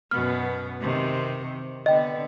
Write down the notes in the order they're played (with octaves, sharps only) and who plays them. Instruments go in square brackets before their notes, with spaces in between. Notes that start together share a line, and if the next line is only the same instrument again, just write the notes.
[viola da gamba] F#2 B2 B3 [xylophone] F6
[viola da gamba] C3 D#3 C4
[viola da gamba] D3 B3 [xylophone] D#5 G5